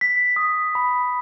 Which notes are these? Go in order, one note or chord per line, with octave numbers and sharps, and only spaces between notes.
B6
D#6
B5